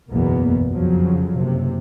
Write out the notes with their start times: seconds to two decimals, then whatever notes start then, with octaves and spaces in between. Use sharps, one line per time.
0.11 F#1 B1 E2 B2 A#3 B3
0.73 F2 C#3 F3 F#3
1.36 F#1 C3